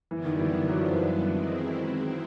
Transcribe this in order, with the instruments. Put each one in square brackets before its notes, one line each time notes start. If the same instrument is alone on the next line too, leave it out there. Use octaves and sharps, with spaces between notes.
[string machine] F#2 D3 G3 B3 D4 [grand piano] E3
[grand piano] D#3
E3
D#3
F#3
F3
E3
F3
[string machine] D#3 G#3 C4 E4